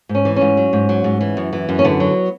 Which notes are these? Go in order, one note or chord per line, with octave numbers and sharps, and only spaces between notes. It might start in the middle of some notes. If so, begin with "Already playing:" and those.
G#2
C#4
E3
G#2 C#4
F#3
G#2
F#3
G#2
E3
F#2
E3
F#2
C#4
D3 B3
F#3